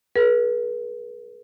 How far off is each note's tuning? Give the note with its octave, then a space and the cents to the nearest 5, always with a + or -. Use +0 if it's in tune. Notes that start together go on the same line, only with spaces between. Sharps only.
G#4 +30 B4 -40